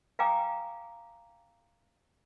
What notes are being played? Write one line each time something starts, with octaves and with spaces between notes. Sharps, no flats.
F5 G5 G#5 A#5 D6 D#6